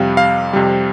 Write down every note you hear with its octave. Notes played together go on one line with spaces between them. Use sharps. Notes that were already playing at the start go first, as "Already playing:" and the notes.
Already playing: F2 C3 G3 F5
F5
F2 C3 G3